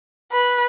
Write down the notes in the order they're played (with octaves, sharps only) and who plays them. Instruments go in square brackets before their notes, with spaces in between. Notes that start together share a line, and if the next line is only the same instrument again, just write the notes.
[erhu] B4